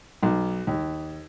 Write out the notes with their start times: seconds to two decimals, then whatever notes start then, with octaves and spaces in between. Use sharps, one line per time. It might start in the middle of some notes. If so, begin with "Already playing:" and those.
0.23 B1
0.67 D#2